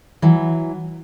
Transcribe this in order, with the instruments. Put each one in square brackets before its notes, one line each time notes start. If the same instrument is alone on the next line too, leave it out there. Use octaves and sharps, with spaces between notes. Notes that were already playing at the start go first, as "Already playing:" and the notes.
[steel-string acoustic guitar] E3 F#3